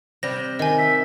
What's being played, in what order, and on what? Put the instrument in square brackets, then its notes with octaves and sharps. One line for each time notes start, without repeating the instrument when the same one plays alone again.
[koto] C3 G3 [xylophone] A#6
[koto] D#3 [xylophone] D#5 G#5
[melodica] E5